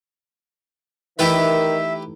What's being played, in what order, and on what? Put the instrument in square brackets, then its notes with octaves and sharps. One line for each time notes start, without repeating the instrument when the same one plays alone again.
[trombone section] D#3 [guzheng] E3 A3 D#4 [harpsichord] E4 G4 B4 [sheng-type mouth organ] E5